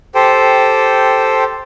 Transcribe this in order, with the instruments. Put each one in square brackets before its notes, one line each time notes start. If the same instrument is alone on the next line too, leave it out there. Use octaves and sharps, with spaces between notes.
[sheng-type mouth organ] G4 A4 C5 G5